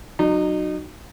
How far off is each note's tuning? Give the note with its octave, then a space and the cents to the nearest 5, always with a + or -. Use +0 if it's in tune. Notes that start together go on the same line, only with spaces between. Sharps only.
F#3 +0 D#4 -30